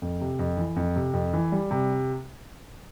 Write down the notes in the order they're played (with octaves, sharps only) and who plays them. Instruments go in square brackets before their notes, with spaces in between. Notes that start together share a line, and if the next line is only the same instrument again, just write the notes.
[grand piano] F2
C3
F2
E3
F2
C3
F2
E3
G3
C3